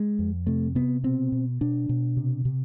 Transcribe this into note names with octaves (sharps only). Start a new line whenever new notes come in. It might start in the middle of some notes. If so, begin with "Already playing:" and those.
Already playing: G#3
F2
C3 A3
C3 B3
B2 C4
B2
B2 D4
B2
C3
C3